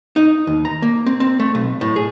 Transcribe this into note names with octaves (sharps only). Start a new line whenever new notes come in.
D#4
D#2
A#5
A#3
C4
C4
A3
B1
A2
G#4